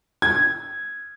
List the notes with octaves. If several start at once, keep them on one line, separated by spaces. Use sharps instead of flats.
G#6